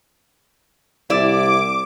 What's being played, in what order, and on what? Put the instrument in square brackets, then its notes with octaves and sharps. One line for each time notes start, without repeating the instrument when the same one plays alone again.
[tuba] C2 [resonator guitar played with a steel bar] E4 D5 [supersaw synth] D6